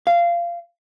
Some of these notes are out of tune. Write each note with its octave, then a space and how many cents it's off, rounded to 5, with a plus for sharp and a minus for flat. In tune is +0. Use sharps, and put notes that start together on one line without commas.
F5 -20